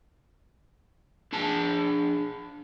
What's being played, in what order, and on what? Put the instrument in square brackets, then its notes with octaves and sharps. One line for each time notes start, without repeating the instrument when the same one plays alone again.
[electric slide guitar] D4 G#4 A5